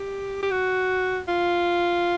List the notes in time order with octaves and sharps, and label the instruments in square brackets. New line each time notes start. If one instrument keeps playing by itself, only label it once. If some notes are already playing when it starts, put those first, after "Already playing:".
Already playing: [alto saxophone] G4
G4
F#4
F4